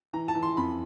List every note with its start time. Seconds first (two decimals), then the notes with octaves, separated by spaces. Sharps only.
0.13 E3 A#5
0.28 A5
0.35 E3
0.42 C6
0.57 F2 B5